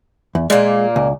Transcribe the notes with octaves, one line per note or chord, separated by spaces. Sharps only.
E2
A#2 G#3 A#3
C#2